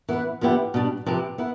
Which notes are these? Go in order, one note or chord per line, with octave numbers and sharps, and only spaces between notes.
E3 B3 E4 B4
D3 F3 B3 E4 G4
B2 G3 D4
C3 F3 C4 G4 B4
B3 E4 B4